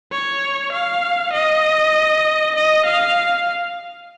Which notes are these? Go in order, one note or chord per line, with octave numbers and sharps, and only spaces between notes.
C#5
F5
D#5
D#5
F5